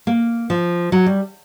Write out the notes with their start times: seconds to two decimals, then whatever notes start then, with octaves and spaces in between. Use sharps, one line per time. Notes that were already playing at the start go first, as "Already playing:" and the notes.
0.07 A#3
0.50 F3
0.92 F#3
1.06 G3